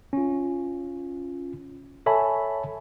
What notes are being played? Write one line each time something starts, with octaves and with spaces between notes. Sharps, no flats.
C#4 F4
A4 C#5 E5 G#5 A5 B5